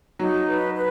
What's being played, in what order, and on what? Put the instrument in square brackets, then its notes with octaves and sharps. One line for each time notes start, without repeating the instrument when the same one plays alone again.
[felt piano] F#3 [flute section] D#4
[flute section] B4
B4